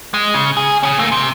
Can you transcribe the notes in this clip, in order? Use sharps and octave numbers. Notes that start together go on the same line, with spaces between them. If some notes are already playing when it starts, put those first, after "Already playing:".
G#3
C#3
G#4
C#4 G#4
A3 A#3
C3